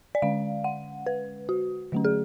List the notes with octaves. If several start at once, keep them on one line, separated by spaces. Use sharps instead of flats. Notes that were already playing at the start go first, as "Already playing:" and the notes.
D5
D3 G#3 C#4 F5
F#5
B4
F#4
D3 F#3 A3 C#4
G#4